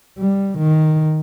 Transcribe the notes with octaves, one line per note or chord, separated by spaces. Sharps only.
G3
D#3